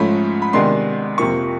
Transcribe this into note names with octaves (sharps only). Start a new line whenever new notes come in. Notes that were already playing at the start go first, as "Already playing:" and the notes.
Already playing: G#2 F3 A3 C#4 B5
B5
C3 D#3 G#3 B3 D4 C6
F2 C3 F3 A#3 C#6